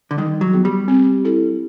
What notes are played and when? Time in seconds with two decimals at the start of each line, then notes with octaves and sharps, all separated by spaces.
0.11 D3
0.18 D#3 G3
0.41 F#3
0.53 B3 D#4 G#4
0.65 G3
0.88 C4
1.25 E4 A4